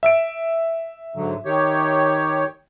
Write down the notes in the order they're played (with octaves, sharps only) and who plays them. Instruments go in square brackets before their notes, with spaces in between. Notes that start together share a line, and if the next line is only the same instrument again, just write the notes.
[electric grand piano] E5 E6 D7
[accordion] G#2 D3 F#3
D#3 G4 C#5